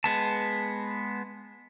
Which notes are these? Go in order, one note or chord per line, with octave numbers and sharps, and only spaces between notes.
G#3 B3 A5